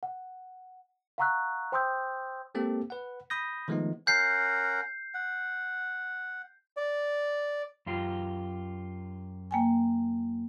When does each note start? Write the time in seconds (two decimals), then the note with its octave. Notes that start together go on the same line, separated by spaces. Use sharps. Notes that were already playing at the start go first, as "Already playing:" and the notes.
0.03 F#5
1.18 F5 F#5 A#5 C#6 E6 F#6
1.72 C5 G5 C6 D#6 E6 G6
2.55 G#3 A#3 C4 G4 A4
2.90 B4 F#5
3.30 B5 D#6 G6 A#6
3.68 D#3 F3 G#3 A3 B3 D#4
4.07 C#4 A#4 F#5 G6 C7
5.14 F#5
6.77 D5
7.86 F#2 F4 G4
9.51 A#3 G5 G#5